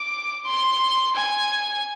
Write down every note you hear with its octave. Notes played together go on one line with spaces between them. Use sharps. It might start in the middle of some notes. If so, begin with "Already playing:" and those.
Already playing: D6
C6
G#5